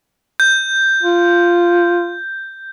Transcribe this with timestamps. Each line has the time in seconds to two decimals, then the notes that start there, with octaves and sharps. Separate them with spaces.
0.40 G6
1.03 F4